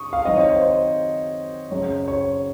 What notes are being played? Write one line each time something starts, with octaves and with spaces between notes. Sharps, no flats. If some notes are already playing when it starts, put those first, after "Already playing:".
Already playing: C#3 C#6 D#6
F5
D#3 F#3 C4 D#5
C#5
C5
C5
F#2 C#3 F#3 C#5
C#5